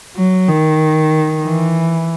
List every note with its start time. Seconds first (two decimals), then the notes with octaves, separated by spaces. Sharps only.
0.16 F#3
0.48 D#3
1.44 E3